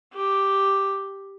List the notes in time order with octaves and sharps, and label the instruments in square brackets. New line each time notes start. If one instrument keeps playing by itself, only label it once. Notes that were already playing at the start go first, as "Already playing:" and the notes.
[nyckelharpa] G4